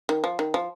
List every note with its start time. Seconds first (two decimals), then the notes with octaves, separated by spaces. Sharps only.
0.09 D#3
0.24 F3
0.39 D#3
0.54 F3